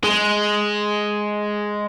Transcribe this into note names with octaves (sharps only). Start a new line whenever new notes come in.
G#3